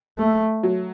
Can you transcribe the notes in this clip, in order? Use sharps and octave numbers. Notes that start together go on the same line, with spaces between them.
A3
F#3